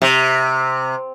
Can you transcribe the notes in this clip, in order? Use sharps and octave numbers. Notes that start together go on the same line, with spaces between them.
C3